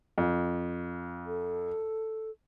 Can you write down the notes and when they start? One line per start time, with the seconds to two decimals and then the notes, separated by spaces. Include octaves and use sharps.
0.18 F2
1.26 A4